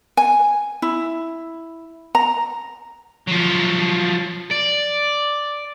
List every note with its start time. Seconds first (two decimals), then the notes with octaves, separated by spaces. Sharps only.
0.17 G#5
0.82 E4
2.15 A#5
3.27 F3 F#3
4.51 D5